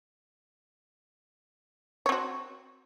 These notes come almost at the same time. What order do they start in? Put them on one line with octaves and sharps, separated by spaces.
C#5 C4 F#4